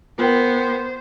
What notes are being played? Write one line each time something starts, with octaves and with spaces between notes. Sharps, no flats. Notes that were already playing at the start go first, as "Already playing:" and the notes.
B3 F4 A#4 C5 G5